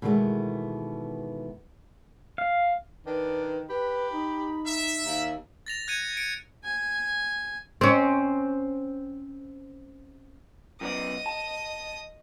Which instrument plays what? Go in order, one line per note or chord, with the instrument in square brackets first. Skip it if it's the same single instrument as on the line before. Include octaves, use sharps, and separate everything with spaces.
[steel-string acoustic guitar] B2 D#3 E3 G#3 A3 B3
[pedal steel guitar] F5
[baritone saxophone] D#3 [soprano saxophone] D4 [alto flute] B4
[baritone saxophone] G4 [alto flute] B4 [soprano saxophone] B5
[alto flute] D#4
[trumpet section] E5
[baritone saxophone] D#2 [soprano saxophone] A#4
[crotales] A6 A#6 F7
F#6 G#6 C#7 D#7
C#7 D7
[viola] G#5
[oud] C4 C#4
[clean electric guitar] F#2 B3 D5 [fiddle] D#5 D#6
[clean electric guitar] A5